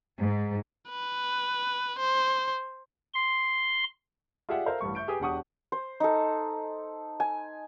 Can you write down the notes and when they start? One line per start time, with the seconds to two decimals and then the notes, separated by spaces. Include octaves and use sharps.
0.18 G#2
0.90 B4
1.99 C5
3.14 C6
4.49 F4 G4 G#4 D5 E5 F#5
4.66 A4 A#4 C5 E5 F5
4.81 A1 G2 G3 C#6
4.95 E5 C#6 G6 D7
5.08 G4 G#4 B4 G#5 D#6
5.20 E1 D4 G4 F#5 C#6 D#6
5.72 C5
6.00 D#4 A4
7.20 G#5